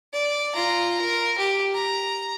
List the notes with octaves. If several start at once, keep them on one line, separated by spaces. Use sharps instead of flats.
D5
F4 A#5
A#4
G4
A#5